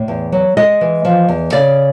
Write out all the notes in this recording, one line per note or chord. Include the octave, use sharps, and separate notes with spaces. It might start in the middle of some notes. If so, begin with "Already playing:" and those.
Already playing: A2 D5
E2
F#3
G#3 D#5
E3
F3
E2
C#3 D5